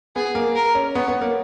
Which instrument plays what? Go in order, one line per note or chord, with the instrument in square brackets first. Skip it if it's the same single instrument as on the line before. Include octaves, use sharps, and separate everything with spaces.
[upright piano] B3 [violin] G#4
[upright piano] A#3
[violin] A#4
[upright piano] C#4
[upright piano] B3 [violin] C#5
[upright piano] B3
A#3